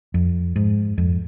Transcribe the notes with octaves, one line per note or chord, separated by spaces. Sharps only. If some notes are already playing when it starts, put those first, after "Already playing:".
F2
G#2
F2